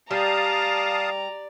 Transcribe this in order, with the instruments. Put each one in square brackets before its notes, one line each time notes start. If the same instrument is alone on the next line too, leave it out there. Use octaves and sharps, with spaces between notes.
[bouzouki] G3 [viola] D5 [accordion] F5 A5 D#6 [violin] A#5